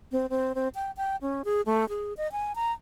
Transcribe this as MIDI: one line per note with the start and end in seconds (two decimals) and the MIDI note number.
0.12 0.26 60
0.30 0.53 60
0.55 0.68 60
0.75 0.91 79
0.97 1.16 79
1.22 1.42 61
1.45 1.61 68
1.66 1.88 57
1.89 2.13 68
2.17 2.30 75
2.32 2.55 80
2.55 2.72 82